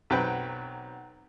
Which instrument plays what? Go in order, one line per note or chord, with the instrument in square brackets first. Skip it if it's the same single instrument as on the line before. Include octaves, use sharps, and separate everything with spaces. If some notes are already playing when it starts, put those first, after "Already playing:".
[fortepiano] B1 F#3 C4 B4 G5